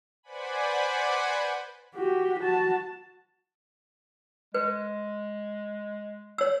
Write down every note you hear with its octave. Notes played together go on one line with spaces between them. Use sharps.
B4 C5 D5 F#5 G#5 B5
F#4 G4
F#4 A5
G#3 B4
C#5 E6